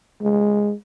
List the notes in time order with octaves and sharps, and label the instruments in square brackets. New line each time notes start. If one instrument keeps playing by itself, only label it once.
[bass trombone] G#3